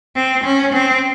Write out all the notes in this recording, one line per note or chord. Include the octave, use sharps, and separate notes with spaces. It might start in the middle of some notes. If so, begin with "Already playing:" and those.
C4
C#4
C4